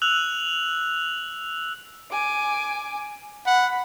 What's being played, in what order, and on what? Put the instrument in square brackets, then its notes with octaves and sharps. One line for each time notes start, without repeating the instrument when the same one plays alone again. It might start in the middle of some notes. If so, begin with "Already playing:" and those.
[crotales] E6 F#6 F7 F#7
[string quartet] G#5 D6
[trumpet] F#5 [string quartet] B5